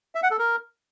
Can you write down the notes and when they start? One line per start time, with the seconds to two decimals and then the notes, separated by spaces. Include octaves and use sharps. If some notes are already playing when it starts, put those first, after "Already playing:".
0.15 E5
0.23 F#5
0.31 A4
0.39 A#4